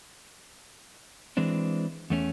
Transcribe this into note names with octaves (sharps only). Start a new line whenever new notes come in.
E3 G#3 C4 D4
E2 A3 C#4